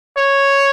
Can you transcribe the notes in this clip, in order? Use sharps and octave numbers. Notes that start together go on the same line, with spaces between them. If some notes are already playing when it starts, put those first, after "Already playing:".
C#5